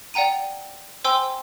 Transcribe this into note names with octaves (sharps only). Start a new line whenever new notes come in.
D5 F#5 G5 A#5 D#7
C5 G5 G#5 C6 E6 G7